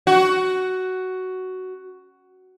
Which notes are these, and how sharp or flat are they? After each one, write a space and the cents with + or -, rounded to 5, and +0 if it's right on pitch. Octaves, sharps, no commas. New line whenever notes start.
F#4 +10